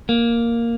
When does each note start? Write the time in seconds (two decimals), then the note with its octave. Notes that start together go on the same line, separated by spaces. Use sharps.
0.09 A#3